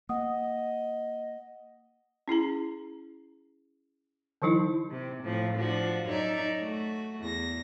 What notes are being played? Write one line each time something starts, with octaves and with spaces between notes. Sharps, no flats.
A#3 D#5 F#5 D#6
C#4 E4 G#4 A#5
D3 E3 F#3 D#4 E4
C3
A2 F3 C4
F3 D4 F#4
F#2 D#4 C#5 D5 E5
A3 F#4
E2 A#6